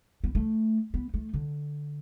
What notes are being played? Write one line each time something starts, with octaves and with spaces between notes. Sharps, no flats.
B3
A3
B3
A3
D3